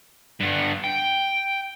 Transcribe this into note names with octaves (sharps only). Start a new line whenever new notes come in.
G2 B3
G5